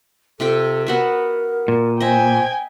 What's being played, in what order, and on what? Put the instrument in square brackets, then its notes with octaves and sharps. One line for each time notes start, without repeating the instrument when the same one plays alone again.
[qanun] C3 F4 G5 [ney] A4
[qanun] B3 F#4 E5 [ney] A#4
[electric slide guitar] A#2
[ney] C5 [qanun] D#5 E5 [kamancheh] G5 G#5